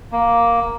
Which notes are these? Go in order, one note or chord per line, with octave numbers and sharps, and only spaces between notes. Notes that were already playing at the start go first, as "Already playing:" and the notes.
A#3